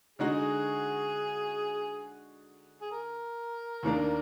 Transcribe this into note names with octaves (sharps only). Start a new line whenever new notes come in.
D3 G#3 D#4 F#4 G#4
G#4
A#4
D#2 D#3 A#3 D4